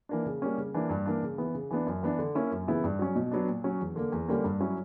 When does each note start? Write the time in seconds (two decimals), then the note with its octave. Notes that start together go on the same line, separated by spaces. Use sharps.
0.09 E3 A#3 D4
0.26 C#3
0.42 G3 A#3 C#4
0.58 C#3
0.74 E3 A#3 D4
0.89 G2
1.06 E3 A#3 D4
1.23 C#3
1.38 E3 B3
1.54 C#3
1.71 E3 B3 D4
1.87 F#2
2.03 E3 B3 D4
2.19 D3
2.35 A#3 C#4 E4
2.51 F#2
2.67 C#3 E3 B3 E4
2.84 G2
2.99 F#3 C#4
3.16 B2
3.32 F#3 B3 D4
3.48 A#2
3.64 F#3 C#4
3.80 E2
3.96 D3 A#3
4.12 E2
4.28 D3 G3 A#3 C#4
4.44 G2
4.60 F#3 C#4 E4